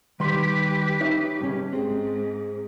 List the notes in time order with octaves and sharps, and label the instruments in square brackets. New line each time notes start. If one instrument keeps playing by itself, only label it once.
[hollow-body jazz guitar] D#3 G3 C6 [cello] G4 B4
[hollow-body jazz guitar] D#4 C#5 E5
G2 C#3 C#4
[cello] G#2 [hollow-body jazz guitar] C4 [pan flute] G#4